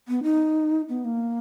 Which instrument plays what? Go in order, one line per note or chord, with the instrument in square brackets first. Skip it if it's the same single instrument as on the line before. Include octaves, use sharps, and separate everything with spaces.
[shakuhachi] B3
D#4
B3
A#3